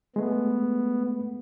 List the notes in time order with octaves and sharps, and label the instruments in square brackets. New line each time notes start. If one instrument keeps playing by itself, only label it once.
[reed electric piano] G#3 A3 [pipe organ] B3